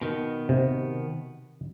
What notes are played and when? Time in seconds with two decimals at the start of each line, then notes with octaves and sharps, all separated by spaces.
0.01 B2 D#3 B3
0.49 C3